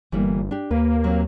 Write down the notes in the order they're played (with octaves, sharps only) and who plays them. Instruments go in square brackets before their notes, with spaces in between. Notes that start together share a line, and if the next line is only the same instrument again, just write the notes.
[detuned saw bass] G1 [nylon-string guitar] E3 G3 A#3
[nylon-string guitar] D4 G4
[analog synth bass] D#2 [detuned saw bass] A#3 [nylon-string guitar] B4
[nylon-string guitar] F#3 C4